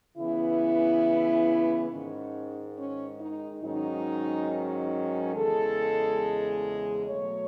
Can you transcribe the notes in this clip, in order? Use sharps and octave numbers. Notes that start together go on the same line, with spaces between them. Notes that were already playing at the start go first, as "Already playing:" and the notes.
C#3 E3 B3 E4
G#2 D#3 G#3 C#4
C#4
D#4
G#2 D#3 F#3 C#4 D#4
E2 C#3 G#3 A4
B2 F#3 A3 C#5